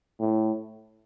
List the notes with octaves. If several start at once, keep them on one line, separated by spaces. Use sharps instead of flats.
A2